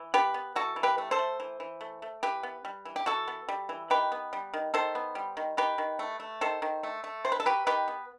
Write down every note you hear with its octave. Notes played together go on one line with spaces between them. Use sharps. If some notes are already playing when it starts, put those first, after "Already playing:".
Already playing: E3
B3 G4 B4
B3
E3 F#4 A4
E3
G4 B4
A3
A4 C5
A3
E3
E3
A3
A3
E3 G4 B4
B3
G3
E3
G4
E3 F#4 A4
B3
G3
E3
D#3 G4 B4
B3
G3
D#3
D#3 A4 C5
B3
G3
D#3
D#3 G4 B4
D#3
A3
A3
D#3 A4 C5
D#3
A3
A3
C3 C5
B4
A4
F#3 G4 B4
D#3 G4 B4
B3